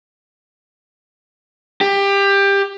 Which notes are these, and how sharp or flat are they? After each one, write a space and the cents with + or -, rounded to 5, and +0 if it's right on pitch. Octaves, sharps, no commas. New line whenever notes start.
G4 +20